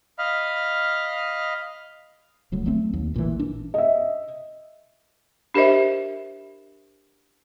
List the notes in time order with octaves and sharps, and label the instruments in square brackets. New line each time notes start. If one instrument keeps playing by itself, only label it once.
[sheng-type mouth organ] D#5 F5 B5 F6
[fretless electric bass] D1 D2 F#3
C2 F#3 A3 C4
D#2
A1 A#2 D3 E3
D4
[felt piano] D#5 E5
[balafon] D4 G4 A#4 C5 D#5 E5